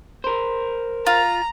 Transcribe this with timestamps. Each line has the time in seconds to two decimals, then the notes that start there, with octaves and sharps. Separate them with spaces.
0.24 A#4 C5
1.07 F4 A#5